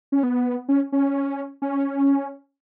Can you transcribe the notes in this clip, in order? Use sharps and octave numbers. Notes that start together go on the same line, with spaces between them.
C#4
B3
C#4
C#4
C#4